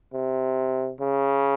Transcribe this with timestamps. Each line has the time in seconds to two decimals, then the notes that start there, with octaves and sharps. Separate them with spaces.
0.14 C3
1.01 C#3